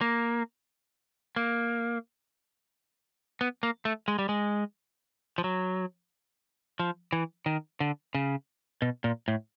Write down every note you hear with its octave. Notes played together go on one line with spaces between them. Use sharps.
A#3
A#3
B3
A#3
A3
G#3
G3
G#3
F3
F#3
F3
E3
D#3
D3
C#3
B2
A#2
A2